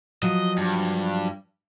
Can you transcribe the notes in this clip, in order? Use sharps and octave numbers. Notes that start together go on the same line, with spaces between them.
F3 F#3 D#5
G2